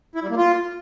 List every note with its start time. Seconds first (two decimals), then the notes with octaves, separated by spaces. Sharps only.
0.15 E4
0.23 G3
0.30 A#3
0.37 F4